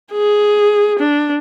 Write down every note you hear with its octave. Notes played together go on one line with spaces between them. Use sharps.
G#4
D4